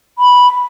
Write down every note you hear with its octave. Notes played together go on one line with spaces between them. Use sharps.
B5